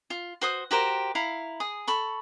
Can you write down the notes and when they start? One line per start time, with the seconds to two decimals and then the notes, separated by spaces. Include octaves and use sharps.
0.10 F4
0.41 F#4 C5 D#6
0.71 F#4 G4 A#4 C5
1.15 E4 F5 A#5
1.60 G#4 D#6
1.87 A4 B5 C#6